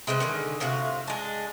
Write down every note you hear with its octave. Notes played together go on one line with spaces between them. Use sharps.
C3 G#3 B4 C5
D3 D#3 G#3
A2 C3 F4 F#4
G#3 D4